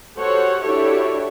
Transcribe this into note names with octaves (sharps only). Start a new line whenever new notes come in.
F#4 G4 A4 C5 C#5 F#5
D4 E4 F#4 G4 A4 C#5